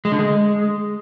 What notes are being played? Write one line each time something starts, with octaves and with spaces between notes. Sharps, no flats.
G#3
D3
G#3